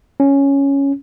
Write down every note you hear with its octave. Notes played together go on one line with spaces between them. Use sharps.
C#4